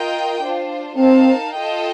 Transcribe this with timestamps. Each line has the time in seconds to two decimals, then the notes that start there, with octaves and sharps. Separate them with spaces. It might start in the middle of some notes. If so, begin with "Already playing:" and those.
Already playing: F4 A#4 D#5 G5
0.42 D4 F4 C5
0.97 C4 D#4 A#4 F5 A5
1.54 F4 A4 D#5 G5